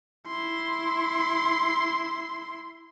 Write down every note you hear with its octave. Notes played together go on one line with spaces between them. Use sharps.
E4 C6